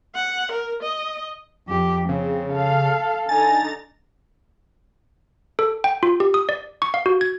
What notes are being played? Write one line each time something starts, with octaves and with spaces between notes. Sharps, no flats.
F#5
A#4
D#5
F2 G4
C#3 C4
A4 F5
D3 D#4 G#5 A#5 A6
A4
G5
F4
G4
D#6
D5
C#6
F5
F#4
G#6